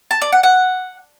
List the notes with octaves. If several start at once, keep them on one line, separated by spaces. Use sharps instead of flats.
A5
D5
F#5
F#5